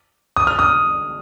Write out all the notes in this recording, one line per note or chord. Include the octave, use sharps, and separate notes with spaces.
D#6
F6
D#6